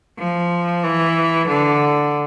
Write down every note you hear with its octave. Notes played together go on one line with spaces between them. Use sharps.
F3
E3
D3